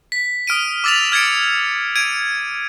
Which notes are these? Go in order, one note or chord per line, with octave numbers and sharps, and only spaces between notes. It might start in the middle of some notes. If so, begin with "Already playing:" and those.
B6
D#6 F6 D7 D#7
D6 E6 A6 B6 F7
F6 G#6 A6 C#7 D7
G#6 D7 D#7